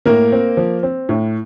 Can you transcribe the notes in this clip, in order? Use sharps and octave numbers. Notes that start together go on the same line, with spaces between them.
A2 A#3 A#4
C4
F3
C4
A2